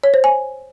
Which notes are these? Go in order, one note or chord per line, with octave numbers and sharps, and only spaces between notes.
C#5
C5
G#5